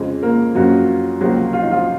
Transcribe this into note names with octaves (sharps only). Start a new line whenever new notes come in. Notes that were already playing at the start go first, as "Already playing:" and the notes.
Already playing: F2 C#3 G#3
A#3 A#4
F#2 F3 F#3 A#3 F#4
C#2 C3 F3 F#3 A#3 F#4
F4
D#4
F3 F4